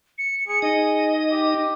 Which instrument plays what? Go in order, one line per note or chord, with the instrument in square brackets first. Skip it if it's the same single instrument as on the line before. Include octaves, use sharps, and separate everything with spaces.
[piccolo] C#7
[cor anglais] G#4 [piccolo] C#7
[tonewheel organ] D#4 [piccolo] D#5
[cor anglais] G4